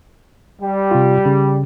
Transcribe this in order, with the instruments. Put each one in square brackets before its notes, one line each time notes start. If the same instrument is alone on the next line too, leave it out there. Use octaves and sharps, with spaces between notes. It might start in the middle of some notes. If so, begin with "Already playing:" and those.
[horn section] G3
[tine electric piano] C3 F4
C#3